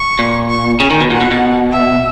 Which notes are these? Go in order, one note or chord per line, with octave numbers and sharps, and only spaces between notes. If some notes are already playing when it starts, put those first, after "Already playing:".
Already playing: C#6
A#2
C#6
C#3 G#5
D#3
B2
A#2 F#5
B2
B2
E5